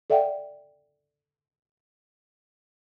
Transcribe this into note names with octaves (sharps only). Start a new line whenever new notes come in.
A4 D5 E5 F#5 G5